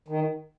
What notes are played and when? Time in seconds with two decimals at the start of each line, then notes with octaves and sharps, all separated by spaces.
0.08 D#3